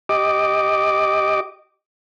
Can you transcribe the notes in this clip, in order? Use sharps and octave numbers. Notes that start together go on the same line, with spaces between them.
G4 D#5 D6